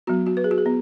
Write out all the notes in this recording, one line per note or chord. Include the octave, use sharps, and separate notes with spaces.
F#3 B3 F#4
F#4
B4
G#4
F#4
G#4
B3